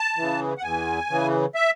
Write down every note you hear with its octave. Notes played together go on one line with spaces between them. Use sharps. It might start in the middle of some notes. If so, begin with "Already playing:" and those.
Already playing: A5
C#3 E3
F#5
E2 G#5
C#3 E3
E5